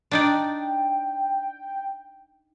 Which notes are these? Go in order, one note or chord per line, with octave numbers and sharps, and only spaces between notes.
D4 D#4 D5 G5